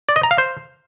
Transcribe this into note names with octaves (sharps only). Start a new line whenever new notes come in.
D5
D#5
A#5
F5
C5